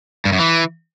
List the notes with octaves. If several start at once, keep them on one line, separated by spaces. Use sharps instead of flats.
G2
F#2
E3